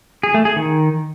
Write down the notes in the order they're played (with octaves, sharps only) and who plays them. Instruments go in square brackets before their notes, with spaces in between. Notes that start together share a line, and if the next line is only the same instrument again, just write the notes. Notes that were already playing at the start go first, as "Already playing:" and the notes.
[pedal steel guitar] G#4
A3
G#4
D#3